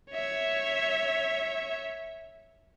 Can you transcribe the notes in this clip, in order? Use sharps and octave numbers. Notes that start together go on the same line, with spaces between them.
C#5 E5